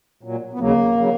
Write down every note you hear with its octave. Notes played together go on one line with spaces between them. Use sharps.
A#2 F#3
B3
D#2 C#3 F#3 A#3
C#3 F#3